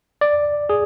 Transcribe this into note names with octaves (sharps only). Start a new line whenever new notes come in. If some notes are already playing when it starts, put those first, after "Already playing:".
D5
G#4